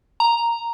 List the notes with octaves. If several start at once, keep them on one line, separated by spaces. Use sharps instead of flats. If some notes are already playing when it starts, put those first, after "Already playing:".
A#5